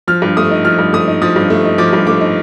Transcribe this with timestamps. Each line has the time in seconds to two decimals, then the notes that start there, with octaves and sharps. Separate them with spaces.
0.07 F3 F6
0.22 G2
0.37 A3 D#6
0.51 D#4
0.65 F3 F6
0.79 G2
0.93 A3 D#6
1.08 D#4
1.22 F3 D#6
1.36 G2
1.50 A3
1.65 D#4
1.78 F3 D6
1.93 G2
2.07 A3 D6
2.21 D#4